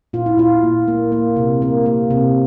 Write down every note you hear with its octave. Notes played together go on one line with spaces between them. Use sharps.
A#2 F4
E4
A#2 F4
A#2
A#3
A#3
C3
A#3
A#3
C3